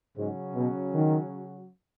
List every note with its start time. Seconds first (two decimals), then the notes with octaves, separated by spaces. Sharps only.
0.16 G#2 C#3 F#3 C#4 F#4
0.55 B2
0.93 D#3